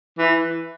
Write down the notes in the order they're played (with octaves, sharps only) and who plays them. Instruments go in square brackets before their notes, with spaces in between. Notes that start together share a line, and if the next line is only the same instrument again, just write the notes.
[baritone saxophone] E3